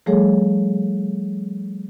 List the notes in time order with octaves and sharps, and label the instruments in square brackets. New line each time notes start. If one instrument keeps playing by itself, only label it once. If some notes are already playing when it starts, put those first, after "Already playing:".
[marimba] F3 G3 A3 G#4 A4 C#5